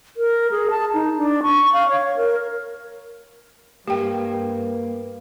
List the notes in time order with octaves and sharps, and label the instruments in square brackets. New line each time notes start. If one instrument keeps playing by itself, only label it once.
[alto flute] A#4
G#4
A5
D#4
D4
C#6
F5
C#5
A#4
[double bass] G2 [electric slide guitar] A#3 [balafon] G4 G5 [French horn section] A#4 B4